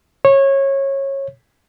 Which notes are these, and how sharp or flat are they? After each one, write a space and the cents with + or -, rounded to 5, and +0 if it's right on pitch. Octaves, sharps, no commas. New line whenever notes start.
C#5 -20